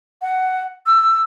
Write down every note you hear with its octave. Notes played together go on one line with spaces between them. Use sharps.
F#5
E6